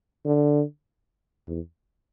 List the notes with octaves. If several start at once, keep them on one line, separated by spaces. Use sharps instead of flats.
D3
E2